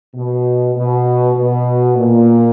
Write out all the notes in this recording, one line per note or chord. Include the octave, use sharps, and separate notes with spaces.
B2
B2
B2
A#2